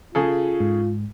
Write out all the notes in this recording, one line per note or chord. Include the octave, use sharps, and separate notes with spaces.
C#3 F4 G#4 A4
G#2